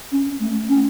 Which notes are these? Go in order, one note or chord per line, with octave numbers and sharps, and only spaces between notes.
C#4
A3
C#4